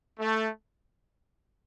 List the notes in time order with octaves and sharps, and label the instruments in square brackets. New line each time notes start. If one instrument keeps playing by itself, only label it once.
[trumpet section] A3